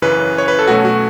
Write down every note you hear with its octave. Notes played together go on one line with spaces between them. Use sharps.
F#2 C#3 E3 C#4 B4
C#5
B4
A4
B2 F#3 A3 C#4 F#4
F#4